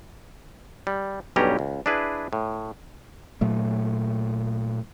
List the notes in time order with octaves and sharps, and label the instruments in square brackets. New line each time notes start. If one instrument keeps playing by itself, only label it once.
[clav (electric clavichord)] G3
B1 G2 G3 C#4 G4 A#5
C#2
D4 E4 G#4 B4
A2
[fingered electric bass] A#2 F#3 A3